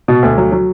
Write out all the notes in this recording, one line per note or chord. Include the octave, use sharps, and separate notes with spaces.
B2
D2
F#3
F#3